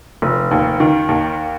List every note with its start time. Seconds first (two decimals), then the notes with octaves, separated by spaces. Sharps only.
0.22 F1
0.51 D#2
0.80 D#3
1.09 D#2